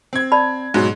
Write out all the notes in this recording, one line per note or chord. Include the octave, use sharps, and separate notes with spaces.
C4 G#6
D5 A5 B5
G#2 B2 F#3